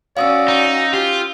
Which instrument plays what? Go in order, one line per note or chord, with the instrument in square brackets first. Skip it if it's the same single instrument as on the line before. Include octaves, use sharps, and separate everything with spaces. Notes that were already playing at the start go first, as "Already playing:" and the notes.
[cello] C#4 F#4 [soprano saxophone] D5 [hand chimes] F5 D#6 E6
[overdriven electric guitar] D#4
[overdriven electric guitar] F4 [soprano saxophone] G4